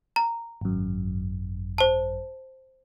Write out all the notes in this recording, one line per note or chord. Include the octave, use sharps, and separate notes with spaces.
A#5
G#1 F#2
C5 A5